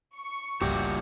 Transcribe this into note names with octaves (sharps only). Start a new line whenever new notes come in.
C#6
G1 C#2 G2 A#2 F#4 G4 E5 D6